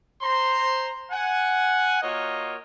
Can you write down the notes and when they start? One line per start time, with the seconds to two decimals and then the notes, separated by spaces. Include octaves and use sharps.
0.22 C5 A#5 C6
1.11 F#5 G#5
2.02 A#3 F4 F#4 A#4 C#5 D#5